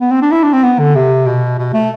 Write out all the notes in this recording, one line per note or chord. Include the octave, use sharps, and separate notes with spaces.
B3
C4
D4
E4
D4
C4
B3
D3
C3
B2
B2
A3